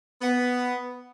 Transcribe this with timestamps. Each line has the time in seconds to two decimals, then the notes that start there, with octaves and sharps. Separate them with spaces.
0.22 B3